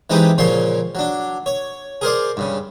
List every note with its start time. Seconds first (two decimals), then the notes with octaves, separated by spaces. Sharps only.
0.10 E3 G#3 C4 D#4 G4 B4
0.38 A#2 C#3 F3 C#5 C6
0.95 F#3 D4
1.46 C#5
2.01 G#4 A#4 C5 D5
2.37 G2 C#3